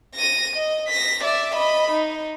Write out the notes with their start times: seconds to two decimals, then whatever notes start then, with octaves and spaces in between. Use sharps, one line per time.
0.15 A#6 D#7
0.56 D#5
0.87 A#6 B6
1.23 D5 E5
1.55 D#5 B5
1.90 D#4